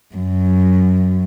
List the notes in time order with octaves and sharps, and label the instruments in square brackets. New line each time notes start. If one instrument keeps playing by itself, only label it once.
[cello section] F#2